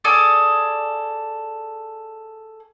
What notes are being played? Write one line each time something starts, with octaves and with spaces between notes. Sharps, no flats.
G#4 A4 D5